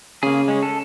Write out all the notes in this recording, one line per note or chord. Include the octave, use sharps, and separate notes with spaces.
C#3 A#3 G#4
G#3 C#4
A4